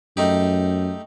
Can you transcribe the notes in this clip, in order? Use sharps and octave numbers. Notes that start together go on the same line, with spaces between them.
F#2 A3 D#4 G4